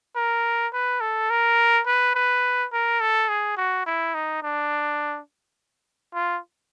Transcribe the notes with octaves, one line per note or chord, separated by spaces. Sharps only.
A#4
B4
A4
A#4
B4
B4
A#4
A4
G#4
F#4
E4
D#4
D4
F4